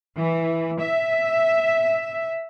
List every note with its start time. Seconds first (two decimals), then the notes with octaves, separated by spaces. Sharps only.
0.17 E3
0.80 E5